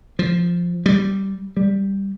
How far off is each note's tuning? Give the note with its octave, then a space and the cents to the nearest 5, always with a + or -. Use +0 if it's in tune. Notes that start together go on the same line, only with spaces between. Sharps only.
F3 -5
G3 -10
G3 +0